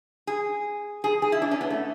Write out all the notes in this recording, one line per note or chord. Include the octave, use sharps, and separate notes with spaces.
G#4
G#4
G#4
E4
D4
C#4
B3
A3